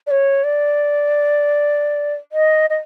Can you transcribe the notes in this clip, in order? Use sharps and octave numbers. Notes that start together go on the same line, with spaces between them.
D5
C#5
D5
D#5
D#5